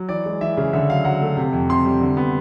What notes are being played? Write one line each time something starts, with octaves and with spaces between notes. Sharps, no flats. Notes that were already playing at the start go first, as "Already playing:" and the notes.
Already playing: F#3
E3 D5
G#3
E3 E5
C#3
D3 E5
F#3 F5
F#3 F#5
A3
C3
F2
C3 C6
G3
D3
B3